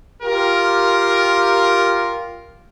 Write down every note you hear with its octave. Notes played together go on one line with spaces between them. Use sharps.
F4 G4 A#4